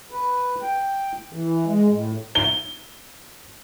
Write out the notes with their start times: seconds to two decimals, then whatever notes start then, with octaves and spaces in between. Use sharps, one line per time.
0.11 B4
0.63 G5
1.33 E3
1.66 G#3
1.89 A2
2.35 G7